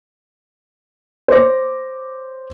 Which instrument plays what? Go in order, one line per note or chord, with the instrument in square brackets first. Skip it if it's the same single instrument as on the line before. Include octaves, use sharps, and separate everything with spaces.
[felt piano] C5 C#5 D6 A#6